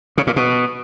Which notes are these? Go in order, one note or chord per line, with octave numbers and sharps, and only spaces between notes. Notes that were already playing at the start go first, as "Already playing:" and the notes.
C#3
A#2
B2